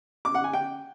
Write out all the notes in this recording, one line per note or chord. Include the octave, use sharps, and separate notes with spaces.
D6
F#5
G#5
G5